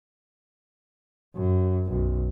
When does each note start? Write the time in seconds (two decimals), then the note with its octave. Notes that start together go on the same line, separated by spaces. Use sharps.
1.35 F#2
1.89 B1 F#2